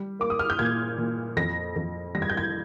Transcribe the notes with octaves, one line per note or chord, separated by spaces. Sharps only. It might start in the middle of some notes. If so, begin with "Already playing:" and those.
Already playing: G3
A#3 D6
D#6
F6
G6
A#2 G#6
A#2
F2 A#6
F2
G3 A#6
G#6
G6
G#6